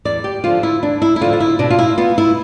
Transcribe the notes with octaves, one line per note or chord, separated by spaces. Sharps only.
E2 D5
G4
D3 F3 F4
E4
E2 D4
E4
E4
D3 F3 F4
F4
E4
B2 D4
F4
E4
B3 F4
E4